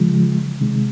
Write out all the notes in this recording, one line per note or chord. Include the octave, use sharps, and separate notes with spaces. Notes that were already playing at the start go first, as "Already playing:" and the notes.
Already playing: C#3 F3 G#3
C3 D#3 G#3